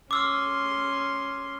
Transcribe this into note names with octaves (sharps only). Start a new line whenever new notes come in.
C#4 C6 D6 E6 F6